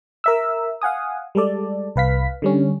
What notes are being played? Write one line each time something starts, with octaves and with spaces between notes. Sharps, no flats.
A#4 E5 E6
F5 F#5 G#5 D#6
G3 G#3 A4 D5
C2 B4 F5 B6
D3 G3 C#4